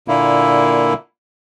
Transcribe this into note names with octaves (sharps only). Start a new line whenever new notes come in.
A#2 D3 A#3 E4